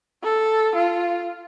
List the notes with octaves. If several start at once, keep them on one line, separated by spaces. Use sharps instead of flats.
A4
F4